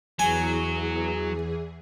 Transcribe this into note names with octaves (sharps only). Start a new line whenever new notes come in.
E2 E3 F#3 G#4 G#5